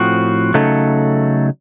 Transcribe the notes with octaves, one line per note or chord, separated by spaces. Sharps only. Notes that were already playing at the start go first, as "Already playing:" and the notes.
Already playing: A2 F3 C4 F#4
C#3 F#3 A3 D#4 A4